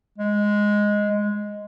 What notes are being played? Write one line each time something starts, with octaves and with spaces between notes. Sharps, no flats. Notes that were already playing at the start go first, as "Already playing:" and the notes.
G#3
G#3